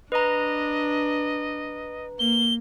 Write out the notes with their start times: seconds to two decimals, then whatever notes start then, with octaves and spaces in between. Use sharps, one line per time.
0.12 D4 B4 D#5 A#5
2.19 A#3 G7